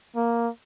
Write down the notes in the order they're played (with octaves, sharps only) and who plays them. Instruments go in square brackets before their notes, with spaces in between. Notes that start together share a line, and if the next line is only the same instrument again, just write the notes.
[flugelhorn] A#3